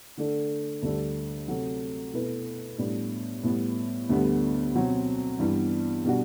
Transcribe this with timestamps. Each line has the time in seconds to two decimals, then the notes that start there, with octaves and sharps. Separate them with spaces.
0.17 D3 A3 D4 A4
0.82 D2 D3 G3 D4 A4
1.48 C3 F#3 A3
2.14 B2 A3 E4 B4
2.78 A2 G3 B3 D4
3.43 A2 G3 B3
4.09 D2 D3 G3 B3
4.75 B2 F#3 C4
5.39 G2 E3 G3 B3
6.05 B2 G3 D4 F#4